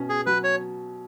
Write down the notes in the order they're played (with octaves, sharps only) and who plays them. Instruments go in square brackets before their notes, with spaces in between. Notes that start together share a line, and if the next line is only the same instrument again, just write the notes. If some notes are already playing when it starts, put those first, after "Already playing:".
Already playing: [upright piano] B2 C#4
[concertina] G#4
[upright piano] F#3 [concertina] B4
[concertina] C#5